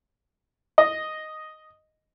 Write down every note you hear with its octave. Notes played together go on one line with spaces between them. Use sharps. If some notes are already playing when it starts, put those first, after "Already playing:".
D#5